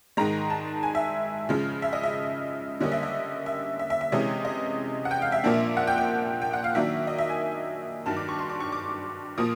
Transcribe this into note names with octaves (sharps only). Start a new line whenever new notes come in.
G#2 D#3 G#3 A#5
A5
G#5
E5
C#3 F3 G#3
E5
D#5
E5
D3 G3 A#3 C#4 D#5
E5
D#5
E5
E5
E5
E5
C3 E3 G#3 C#4 D#5
D#5
F#5
G5
F5
E5
A#2 F3 A#3 D4
F#5
G5
G5
G5
F#5
F5
D#3 F#3 A#3 D4 E5
D#5
E5
G#5
G2 D#3 F#3 A5
D6
C#6
C6
D6
C#6
D6
A#2 F3 A#3 D#6